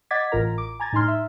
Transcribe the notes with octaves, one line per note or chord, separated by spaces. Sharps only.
D#5 F#5 D6 G#6 A6 B6
A1 A2 F4 A#4 A#5
D6
G#5 A#5 G#6 A6
A2 D#4 A#5 C6 F6
E5